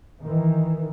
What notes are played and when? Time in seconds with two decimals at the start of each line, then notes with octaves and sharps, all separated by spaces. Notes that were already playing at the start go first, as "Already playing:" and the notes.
0.22 D#3 E3